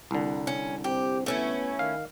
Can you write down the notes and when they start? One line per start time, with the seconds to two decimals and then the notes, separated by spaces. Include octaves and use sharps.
0.11 C2 D3
0.47 C#4
0.84 C4 G4
1.26 A3 B3 C#4 E4
1.79 D#3 F5